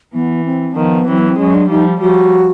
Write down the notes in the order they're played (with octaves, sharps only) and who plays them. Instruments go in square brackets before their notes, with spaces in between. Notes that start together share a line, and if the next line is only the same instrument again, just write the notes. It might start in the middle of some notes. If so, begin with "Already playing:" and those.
[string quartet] E3 [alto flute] B3
[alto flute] C4
[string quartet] D#3 F3 [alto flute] B3
[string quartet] E3 F#3 [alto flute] C4
[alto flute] B3
C4
[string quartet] F#3 G#3 [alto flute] C#4
[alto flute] D4
[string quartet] F3 G3 [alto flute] D#4
[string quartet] F3 G3 [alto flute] F#4